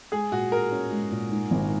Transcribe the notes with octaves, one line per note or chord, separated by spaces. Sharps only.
G#3 G#4
A#2 F#4
G#4 A#4
C#4
G#3
A#2
G#2
G#1